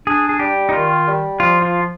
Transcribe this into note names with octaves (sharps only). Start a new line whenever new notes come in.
D4 G#4
G#4
G3 G4
D#4
D#3 F4
G3
F3 F4
F4